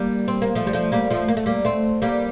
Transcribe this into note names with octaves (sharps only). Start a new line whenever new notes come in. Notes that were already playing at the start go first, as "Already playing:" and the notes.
Already playing: G3 A#3
C4
A#3
F3 A3
G3
F3 A3
G3 A#3
F3 A3
A#3
A3
G3 A#3
A3 C4
G3 A#3